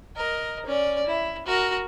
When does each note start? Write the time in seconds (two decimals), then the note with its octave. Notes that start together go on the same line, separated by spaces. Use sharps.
0.16 A#4 D#5
0.66 C#4 D5
1.07 E4
1.46 F#4 A#4